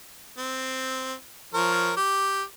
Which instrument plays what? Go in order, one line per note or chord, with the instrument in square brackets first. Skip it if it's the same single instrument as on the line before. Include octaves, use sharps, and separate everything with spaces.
[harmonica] C4
F3 A#4 C#5
G4